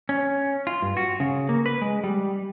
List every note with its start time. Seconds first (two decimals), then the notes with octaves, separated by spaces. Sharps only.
0.09 C#4
0.67 F4
0.82 G2
0.97 F#4
1.20 C#3
1.49 A#3
1.66 B4
1.82 G#3
2.04 G3